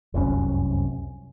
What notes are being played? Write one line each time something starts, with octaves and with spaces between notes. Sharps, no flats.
F1 C2 F#2 C#4